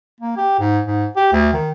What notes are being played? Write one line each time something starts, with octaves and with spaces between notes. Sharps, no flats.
A#3
G4
G#2
G#2
G4
D2
D#3